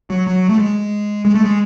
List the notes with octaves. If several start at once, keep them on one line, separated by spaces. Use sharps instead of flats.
F#3
F#3
A3
G#3
G#3
A3
G#3